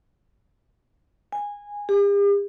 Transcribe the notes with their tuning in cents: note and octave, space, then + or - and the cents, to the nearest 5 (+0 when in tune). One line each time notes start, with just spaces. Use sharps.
G#5 -15
G4 +45